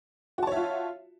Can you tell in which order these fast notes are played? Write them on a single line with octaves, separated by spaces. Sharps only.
F#4 A5 C#5 E5 F4